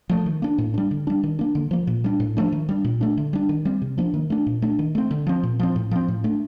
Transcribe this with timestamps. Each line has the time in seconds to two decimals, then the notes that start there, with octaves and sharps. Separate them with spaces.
0.09 F3 A3
0.26 D#3
0.42 A#3 D4
0.58 A2
0.74 G3 D4
0.91 D3
1.07 G3 D4
1.23 D#3
1.39 A#3 D4
1.55 D3
1.71 F3 A#3
1.87 A#2
2.04 G3 D4
2.20 A2
2.37 F3 A3 D4
2.52 D#3
2.69 G3 D4
2.84 A#2
3.01 A3 D4
3.17 D3
3.33 G3 D4
3.49 D#3
3.65 G3 C4
3.82 C3
3.98 F3 A#3 D4
4.14 D#3
4.30 A3 D4
4.47 A#2
4.62 A3 D4
4.79 D#3
4.95 A3 C4
5.11 D3
5.27 F3 C4
5.43 A#2
5.59 F3 C4
5.76 A2
5.91 F3 C4
6.08 A2
6.24 A3 D4